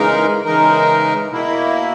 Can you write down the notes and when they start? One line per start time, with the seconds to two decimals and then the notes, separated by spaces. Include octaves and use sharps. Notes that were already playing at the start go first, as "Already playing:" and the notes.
Already playing: C#3 E3 G#3 D#4 A#4
0.44 C#3 E3 G#3 D#4 A#4
1.31 B2 A#3 E4